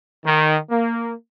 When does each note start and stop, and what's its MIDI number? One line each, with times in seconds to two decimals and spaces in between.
0.24 0.57 51
0.70 1.12 58